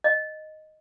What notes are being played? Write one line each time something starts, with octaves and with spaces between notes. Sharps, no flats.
D#5